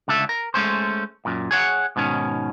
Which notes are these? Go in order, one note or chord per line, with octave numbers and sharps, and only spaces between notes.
C#2 D3 A4 E5
A#4
G#3 A3 C#4 C5
F#2 A#2
G#4 C#5 F#5
G#2 B2 D#3 C#4